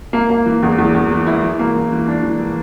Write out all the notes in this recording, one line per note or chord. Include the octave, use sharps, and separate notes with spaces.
A#3
A#3
E3
E2
E2
E2
E3
E4
E3
A#3
E3
E3
D4
E3
E3